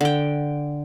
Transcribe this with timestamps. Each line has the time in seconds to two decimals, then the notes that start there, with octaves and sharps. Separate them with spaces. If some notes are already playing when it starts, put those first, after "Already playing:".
0.01 D3 G5